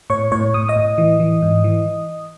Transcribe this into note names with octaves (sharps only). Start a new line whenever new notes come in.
A2 C#5 C#6
A2 C#5 C#6
A2 D#6
D#5 D#6
A2
E3
E3
G#2
E3